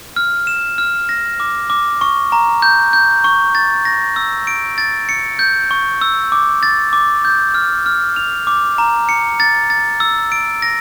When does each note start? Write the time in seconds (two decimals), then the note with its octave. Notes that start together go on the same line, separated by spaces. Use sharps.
0.16 F6
0.47 E7
0.78 F6
1.09 A#6
1.40 D6
1.70 D6
2.01 C#6
2.32 A#5
2.62 G6
2.93 G6
3.24 C#6
3.55 A6
3.85 A#6
4.16 E6
4.47 D7
4.78 A6
5.09 C#7
5.39 G6
5.71 C#6
6.02 E6
6.32 D6
6.63 A6
6.93 D6
7.25 G6
7.54 F6
7.86 F6
8.16 F7
8.47 D6
8.78 A#5
9.09 C#7
9.40 A6
9.70 A6
10.00 E6
10.32 D7
10.62 A#6